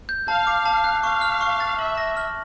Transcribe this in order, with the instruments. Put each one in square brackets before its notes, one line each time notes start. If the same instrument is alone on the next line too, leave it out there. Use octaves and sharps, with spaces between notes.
[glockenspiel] G6
[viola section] F5 [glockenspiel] A5
[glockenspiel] D6
A5
F#6
[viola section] F5 [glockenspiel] C#6
[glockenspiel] F6
C#6
A6
[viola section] E5 [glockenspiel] F#7
[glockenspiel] A#6
F6